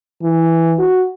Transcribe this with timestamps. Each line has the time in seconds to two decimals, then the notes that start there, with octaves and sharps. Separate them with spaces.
0.22 E3
0.79 F#4